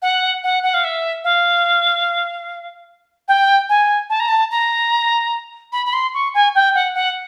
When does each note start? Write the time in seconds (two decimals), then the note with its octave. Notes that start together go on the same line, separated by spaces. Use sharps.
0.02 F#5
0.43 F#5
0.63 F#5
0.74 F5
0.84 E5
1.24 F5
3.28 G5
3.69 G#5
4.09 A5
4.19 A#5
4.28 A5
4.51 A#5
5.72 B5
5.86 B5
5.93 C6
6.14 C#6
6.34 G#5
6.55 G5
6.74 F#5
6.94 F#5